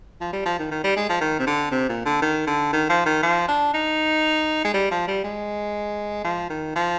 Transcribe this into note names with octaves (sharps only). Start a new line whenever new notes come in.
F3
G3
F3
D#3
D#3
G3
G#3
F3
D#3
C3
D3
C3
A#2
D3
D#3
D3
D#3
F3
D#3
F3
D4
D#4
G#3
G3
F3
G3
G#3
F3
D#3
F3